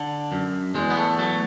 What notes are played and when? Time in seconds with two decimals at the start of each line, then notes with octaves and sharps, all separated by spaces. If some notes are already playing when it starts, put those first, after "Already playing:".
Already playing: D3
0.32 F#2
0.75 E2 G#3
0.90 B3
0.97 A3
1.19 F#3 A3